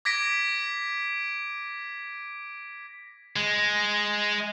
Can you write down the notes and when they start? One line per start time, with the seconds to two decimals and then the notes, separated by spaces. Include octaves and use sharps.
0.05 D6 G#6 A#6 B6 D7
3.36 G#3